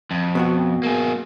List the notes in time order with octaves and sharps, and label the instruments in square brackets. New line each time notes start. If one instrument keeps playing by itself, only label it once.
[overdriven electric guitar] F2
[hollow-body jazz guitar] B2 B3 F#4
[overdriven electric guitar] A#3 G#4